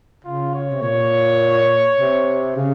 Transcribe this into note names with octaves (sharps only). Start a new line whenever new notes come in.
C#3 F4
C#5
C3
A#2 C#5
C3
C#3